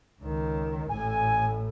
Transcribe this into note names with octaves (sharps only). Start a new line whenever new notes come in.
C#2 D#3
A1 A2 G#5